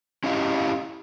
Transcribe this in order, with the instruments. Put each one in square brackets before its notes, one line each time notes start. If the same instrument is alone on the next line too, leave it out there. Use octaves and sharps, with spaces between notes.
[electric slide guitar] C#4 E4 G4 D#5 F5